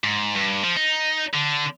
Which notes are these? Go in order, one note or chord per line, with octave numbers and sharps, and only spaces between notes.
G#2
G2
F3
D#4
D3